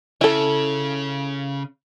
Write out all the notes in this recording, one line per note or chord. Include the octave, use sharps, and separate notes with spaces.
C#3 E4 A4